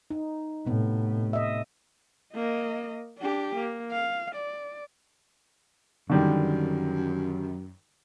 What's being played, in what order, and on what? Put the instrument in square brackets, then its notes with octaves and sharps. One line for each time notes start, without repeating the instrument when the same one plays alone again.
[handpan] D#4
[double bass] A2 [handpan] C3 B3
[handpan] D#5 E5
[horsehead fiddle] A#3 D#5
D4 G4
A#3
F5
D5
[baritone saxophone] F#2 [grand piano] D3 D#3 G3